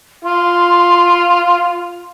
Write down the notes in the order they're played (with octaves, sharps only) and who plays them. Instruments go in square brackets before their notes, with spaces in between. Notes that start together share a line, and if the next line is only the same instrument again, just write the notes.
[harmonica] F4 [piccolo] C6